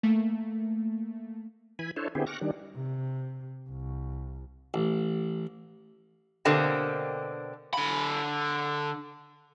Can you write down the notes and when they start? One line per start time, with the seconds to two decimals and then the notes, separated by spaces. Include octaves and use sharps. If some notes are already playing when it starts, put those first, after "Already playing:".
0.03 A3 A#3
1.79 E3 G#5 B5
1.96 D4 E4 A4 C5 C#5
2.15 D3 B3 C4 E4 G4 G#4
2.26 C#6 D6 F6 F#6 A#6
2.41 D#3 G3 D4
2.75 C3
3.69 C2
4.74 A1
6.45 B2 D3 A#3 C4 G4
7.74 D3 B5